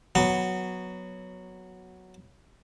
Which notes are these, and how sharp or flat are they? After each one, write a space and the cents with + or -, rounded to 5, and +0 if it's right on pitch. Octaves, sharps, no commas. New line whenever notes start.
F#3 +0 B3 +0 A#5 -35